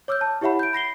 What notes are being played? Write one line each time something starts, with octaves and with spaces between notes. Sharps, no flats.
C#5 D6 E6 F6 G6
A5
E4 G4 C#5 E5 F#5 B5
G6 D7
B5 A#6 C7 G7